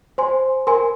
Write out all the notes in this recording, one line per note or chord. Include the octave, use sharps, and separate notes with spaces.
C5 G#5 C6
A#4 G#5 C6